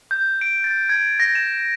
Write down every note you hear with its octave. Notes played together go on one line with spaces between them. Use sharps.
G6
D7
A6
G#6
A#6
E7